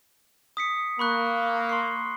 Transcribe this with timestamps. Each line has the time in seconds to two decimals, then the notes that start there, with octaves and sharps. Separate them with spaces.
0.57 D#6 B6 C#7
0.99 A#3 B5 C#6 F#6
1.69 C6 C#6 C7